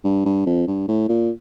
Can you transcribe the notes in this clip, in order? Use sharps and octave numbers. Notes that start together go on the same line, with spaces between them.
G2
G2
F2
G2
A2
A#2